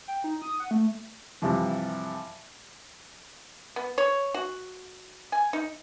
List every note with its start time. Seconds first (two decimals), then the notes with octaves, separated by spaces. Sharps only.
0.08 G5
0.24 D#4
0.42 D#6
0.60 F#5
0.71 A3
1.42 G2 C3 E3 F3
3.76 B3
3.98 C#5
4.34 F#4
5.32 G#5
5.53 D#4